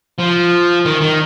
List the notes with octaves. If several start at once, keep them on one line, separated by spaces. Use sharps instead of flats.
F3
D#3
D#3